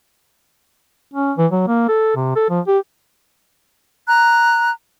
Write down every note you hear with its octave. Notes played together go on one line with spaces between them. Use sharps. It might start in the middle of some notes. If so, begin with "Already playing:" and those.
C#4
E3
F#3
A#3
A4
C3
A4
F3
G4
A#5 F#6